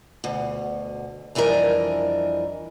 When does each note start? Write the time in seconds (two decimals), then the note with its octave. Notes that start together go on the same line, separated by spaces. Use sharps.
0.24 D2 B2
1.35 F2 E3 G3 D4 A#4 D#5